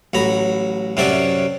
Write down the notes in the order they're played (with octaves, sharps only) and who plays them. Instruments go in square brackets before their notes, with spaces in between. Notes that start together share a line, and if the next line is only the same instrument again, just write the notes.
[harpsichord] A1 F#3 A#5 B5
F#2 C3 C#4 F#4 D5 E5